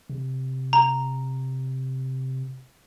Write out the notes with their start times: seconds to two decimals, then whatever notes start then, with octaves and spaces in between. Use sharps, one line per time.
0.10 C3
0.73 A#5